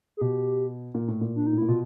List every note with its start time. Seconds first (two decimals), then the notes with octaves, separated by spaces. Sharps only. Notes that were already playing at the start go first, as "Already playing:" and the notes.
0.17 G#4
0.21 B2 G4
0.94 A#2
1.08 A2
1.21 A#2
1.36 D4
1.47 D#4
1.53 A2
1.58 A#2 E4
1.68 B2 F4